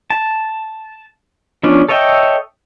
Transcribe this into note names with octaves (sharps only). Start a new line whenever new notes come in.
A5
F3 B3 C#4 D4
A4 C#5 D#5 E5 G5